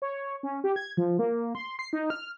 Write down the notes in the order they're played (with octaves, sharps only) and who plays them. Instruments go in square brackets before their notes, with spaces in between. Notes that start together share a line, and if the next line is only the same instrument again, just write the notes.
[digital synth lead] C#5
C#4
G4
G#6
F3
A#3
C6
C7
D#4
F6